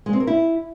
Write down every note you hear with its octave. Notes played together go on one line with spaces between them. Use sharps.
G#3
C4
A#4
E4